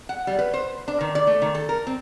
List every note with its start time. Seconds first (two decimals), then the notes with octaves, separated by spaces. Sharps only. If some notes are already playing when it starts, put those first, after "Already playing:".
0.09 F#5
0.27 G3
0.39 B4
0.54 C5
0.88 D4
1.01 D#3
1.15 D5
1.27 A3
1.42 D#3
1.55 A4
1.69 A#4
1.87 C4